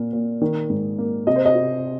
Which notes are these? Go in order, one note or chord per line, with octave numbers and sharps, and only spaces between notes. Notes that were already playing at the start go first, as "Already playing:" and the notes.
Already playing: A#2 A#3
A#2
D#3
G#2
A#3
C3 D#5
C5
D#5
C3